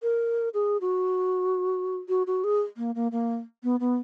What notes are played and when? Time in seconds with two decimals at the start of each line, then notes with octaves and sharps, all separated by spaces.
0.03 A#4
0.54 G#4
0.81 F#4
2.09 F#4
2.27 F#4
2.44 G#4
2.77 A#3
2.95 A#3
3.12 A#3
3.64 B3
3.80 B3